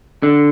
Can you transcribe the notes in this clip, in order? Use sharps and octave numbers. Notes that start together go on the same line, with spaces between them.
D3